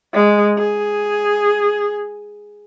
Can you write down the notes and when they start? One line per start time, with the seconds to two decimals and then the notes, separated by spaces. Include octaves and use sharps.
0.14 G#3
0.58 G#4